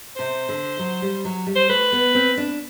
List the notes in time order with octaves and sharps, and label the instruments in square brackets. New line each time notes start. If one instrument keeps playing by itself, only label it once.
[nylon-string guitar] C3 [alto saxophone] C5
[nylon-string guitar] D3
F#3
G3
F#3
G3
[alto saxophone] C5
[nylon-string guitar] A3 [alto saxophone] B4
[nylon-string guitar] B3
C4
D4